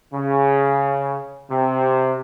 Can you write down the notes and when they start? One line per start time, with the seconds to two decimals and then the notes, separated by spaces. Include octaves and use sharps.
0.13 C#3
1.50 C3